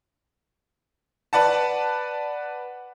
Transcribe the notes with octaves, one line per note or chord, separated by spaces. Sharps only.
B4 D5 F#5 A5